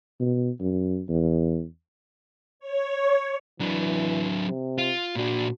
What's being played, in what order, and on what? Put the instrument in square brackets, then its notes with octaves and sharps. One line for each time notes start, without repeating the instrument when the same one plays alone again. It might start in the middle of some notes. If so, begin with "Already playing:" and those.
[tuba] B2
F#2
E2
[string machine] C#5
[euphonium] E3 [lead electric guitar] F#3 D4
[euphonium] C3
[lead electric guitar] F4
[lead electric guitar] A#2 D4 [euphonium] F#4